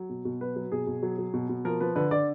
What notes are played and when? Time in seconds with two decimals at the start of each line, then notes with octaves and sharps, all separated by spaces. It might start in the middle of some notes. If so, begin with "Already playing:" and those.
Already playing: F#3
0.09 B2
0.25 B2
0.41 F#3 B4
0.56 F#3
0.72 B2 G#4
0.87 B2
1.03 F#3
1.18 F#3
1.34 B2
1.49 B2
1.65 F3 A#4
1.81 F3 B4
1.96 D3 B4
2.11 D3 D5